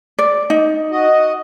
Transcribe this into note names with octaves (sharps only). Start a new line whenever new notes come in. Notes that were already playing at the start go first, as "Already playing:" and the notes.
D5
D#4
F#4 D#5